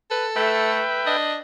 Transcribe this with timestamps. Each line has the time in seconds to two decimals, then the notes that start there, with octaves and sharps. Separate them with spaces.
0.11 A4 B4
0.36 A3 B4 E5 G5
1.06 D4 D#5